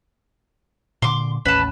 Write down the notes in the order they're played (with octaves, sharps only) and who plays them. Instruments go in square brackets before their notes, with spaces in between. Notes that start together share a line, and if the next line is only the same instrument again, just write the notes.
[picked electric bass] A#2 D3 [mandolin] C6 D6
[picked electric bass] A1 D#2 C#4 [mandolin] B4 A5